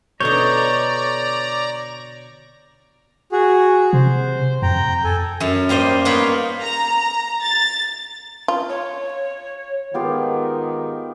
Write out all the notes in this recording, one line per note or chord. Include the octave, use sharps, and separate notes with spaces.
B2 D3 D#4 C#5 D5 A#5 G6
F#4 G#4
C3 C5
F2 G5 A#5
A4 G#5
F#2
G3 A#3 C5 D#5
A#3 B3 D#4 F4 B4 C#5
A#5
A6
F4
C#5
G#2 D#3 B3 F4 G4